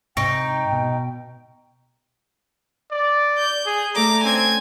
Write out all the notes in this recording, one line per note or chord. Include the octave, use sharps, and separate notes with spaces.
G#2 C3 D#4 G5 C#6 A#6 D7
B2
D5
G6
G#4
A3 A4 D5 A#5 D6
C4 C#4 G#5 G#6